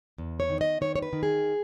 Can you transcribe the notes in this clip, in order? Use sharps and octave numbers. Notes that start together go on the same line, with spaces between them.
E2
C#5
D#3
D#5
D#3 C#5
C#5
B4
D#3
G#4